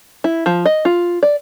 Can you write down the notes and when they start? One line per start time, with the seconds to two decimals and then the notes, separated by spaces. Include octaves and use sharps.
0.24 E4
0.46 F3
0.66 D#5
0.85 F4
1.23 D5